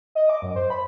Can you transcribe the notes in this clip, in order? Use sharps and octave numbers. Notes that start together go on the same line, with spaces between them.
D#5
D6
F#2
C5
B5